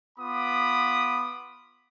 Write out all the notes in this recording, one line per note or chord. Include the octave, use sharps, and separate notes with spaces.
B3 F4 B5 D6 D#6